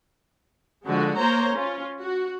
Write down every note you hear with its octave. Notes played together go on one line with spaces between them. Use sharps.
D3 F3 G#3 F#4
A#3 C5 C#5 A#5
C#4 F4
F#4